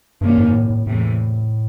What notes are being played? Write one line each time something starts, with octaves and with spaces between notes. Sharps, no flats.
G2 C3 D#3 G3 A#3 C#4
G#2
G#2
A2
A2
E2 A2 C3 E3 A3